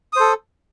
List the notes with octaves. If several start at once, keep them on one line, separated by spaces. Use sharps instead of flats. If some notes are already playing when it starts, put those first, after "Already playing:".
A4 C5 D#6